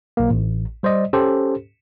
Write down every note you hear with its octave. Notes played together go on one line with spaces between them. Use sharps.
B1 A#3
A1
G3 C5 D5 D#5
C#4 G4 A4 C5